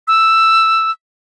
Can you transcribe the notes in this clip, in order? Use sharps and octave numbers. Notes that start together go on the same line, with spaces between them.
E6